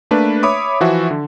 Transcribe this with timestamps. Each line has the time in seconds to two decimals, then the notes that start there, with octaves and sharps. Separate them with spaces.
0.11 A3 A#3 D4 B4
0.43 C#5 E5 B5 D6 D#6
0.81 E3 F3 F#4 E5
1.11 D3